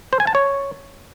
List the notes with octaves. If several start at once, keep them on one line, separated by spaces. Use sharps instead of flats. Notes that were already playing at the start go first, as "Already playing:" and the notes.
C5
G#5
A5
C#5